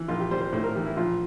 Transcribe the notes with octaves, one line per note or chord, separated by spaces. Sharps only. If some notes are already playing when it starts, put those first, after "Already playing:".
Already playing: E3
A#1 F4
G4
G3 C5
C5
A2 C5
A#4
E3 G4
E4
A#1 F4